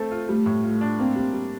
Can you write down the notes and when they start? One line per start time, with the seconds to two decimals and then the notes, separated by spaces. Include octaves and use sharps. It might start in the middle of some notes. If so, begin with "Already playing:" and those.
Already playing: A3 C4 A4
0.11 F4
0.28 G3 A3
0.46 A2
0.64 F4
0.81 D4
0.99 A#3 C4
1.16 G3
1.33 G3